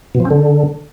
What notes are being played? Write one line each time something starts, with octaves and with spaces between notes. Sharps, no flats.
B2
F3
C4
D3